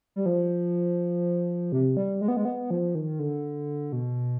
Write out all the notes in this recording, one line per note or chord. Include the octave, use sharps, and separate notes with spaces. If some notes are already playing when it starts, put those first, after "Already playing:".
G3
F3
C3
G3
G#3
B3
G#3
B3
F3
D#3
D3
B2